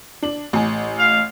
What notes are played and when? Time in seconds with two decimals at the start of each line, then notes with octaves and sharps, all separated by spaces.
0.22 D4 F#7
0.53 A1 G#5
0.98 F5